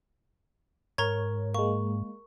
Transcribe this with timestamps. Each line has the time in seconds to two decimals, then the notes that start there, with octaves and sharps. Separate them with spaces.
0.98 G#2 A#4 C#5 A#5 G#6
1.54 G#3 A#3 C#6